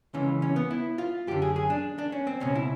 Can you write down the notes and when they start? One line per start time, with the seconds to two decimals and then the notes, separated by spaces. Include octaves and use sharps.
0.14 C#2 C#3 E3 C#4
0.42 C#4
0.56 B3
0.71 E4
0.98 F4
1.27 F#2 D3 G4
1.42 G#4
1.56 G#4
1.70 D4
1.99 D4
2.12 C#4
2.27 C4
2.40 C#2 B2 C#4
2.55 E4